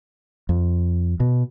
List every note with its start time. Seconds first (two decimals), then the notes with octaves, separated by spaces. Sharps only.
0.49 F2
1.20 B2